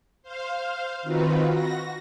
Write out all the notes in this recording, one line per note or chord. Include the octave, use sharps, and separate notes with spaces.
C5 F5
D#3 C4 D#4 F4 F#4 B4
F#4 A#6